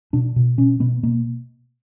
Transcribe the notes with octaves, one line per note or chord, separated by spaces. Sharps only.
B2 D4
B2
B2 C#4
B2 B3
B2 A#3